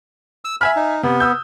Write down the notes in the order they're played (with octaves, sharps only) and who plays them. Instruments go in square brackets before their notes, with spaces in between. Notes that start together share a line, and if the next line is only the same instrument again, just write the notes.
[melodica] E6
[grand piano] E5 G#5 F6 [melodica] B5
[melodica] D#4
[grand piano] C3 [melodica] B3
[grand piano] D#6 E6 G6